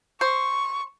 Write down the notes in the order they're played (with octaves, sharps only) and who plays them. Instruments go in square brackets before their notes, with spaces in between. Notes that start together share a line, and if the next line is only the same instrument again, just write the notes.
[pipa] C5 [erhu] C#6